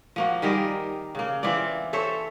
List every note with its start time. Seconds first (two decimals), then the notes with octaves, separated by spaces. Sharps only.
0.16 F3 A#3 F#4
0.42 D#3 G3 G#4 A#4
1.15 C#3 A#3
1.43 E3 C4 F4 D5
1.93 A4 C5 C#5 E5